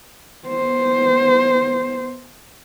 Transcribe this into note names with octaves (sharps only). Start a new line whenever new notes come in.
B3 C5